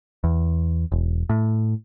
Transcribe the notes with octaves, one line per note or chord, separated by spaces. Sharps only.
E2
E1
A2